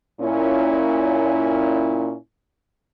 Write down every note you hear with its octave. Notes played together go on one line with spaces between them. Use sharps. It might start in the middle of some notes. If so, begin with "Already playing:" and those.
A#2 C#4 E4